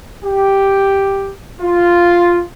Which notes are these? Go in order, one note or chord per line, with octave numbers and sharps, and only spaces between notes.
G4
F4